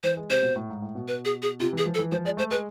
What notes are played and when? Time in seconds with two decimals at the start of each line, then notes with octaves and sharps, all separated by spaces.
0.03 E3 C5
0.17 G#3
0.30 C3 C5
0.42 B2
0.56 A2
0.70 G#2
0.82 A2
0.95 B2
1.08 B4
1.25 G#4
1.42 G#4
1.60 C3 F4
1.73 E3 G#4
1.86 F3
1.94 A4
1.99 E3
2.12 F3 C5
2.25 G#3 D5
2.37 A3 C5
2.51 G#3 B4